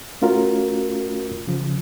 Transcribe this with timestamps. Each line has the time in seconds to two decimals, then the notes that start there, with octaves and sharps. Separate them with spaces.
0.22 A3 C#4 F4 F#4 A#4
1.47 C#3 F3